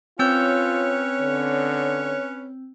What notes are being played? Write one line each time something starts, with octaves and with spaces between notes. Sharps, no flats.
C4 C#4 F4 B4 C#5 E6 G6
D3